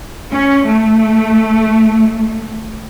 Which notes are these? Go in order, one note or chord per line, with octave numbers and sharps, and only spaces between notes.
C#4
A3